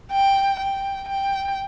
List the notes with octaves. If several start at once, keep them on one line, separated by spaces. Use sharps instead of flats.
G5
G5
G5